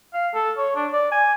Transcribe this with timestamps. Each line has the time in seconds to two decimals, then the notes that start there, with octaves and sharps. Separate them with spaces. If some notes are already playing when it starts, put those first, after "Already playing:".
0.14 F5
0.34 A4
0.57 C#5
0.76 D4
0.92 D5
1.12 G#5